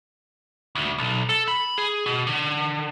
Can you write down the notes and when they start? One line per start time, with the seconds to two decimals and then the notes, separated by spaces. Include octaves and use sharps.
0.75 D2
0.98 B1
1.29 A4
1.48 B5
1.78 G#4
2.06 B2
2.27 D3